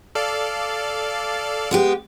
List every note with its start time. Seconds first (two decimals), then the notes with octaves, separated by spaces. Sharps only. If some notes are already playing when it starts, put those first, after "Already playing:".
0.15 A4 D5 F5
1.71 G#3 B3 G4